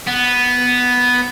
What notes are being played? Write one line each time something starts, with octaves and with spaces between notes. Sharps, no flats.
B3